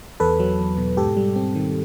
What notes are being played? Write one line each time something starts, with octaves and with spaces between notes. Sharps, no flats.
E2 A4 B4
F#3
E2
B2
G#2 G4 A4
G3
C4
D#3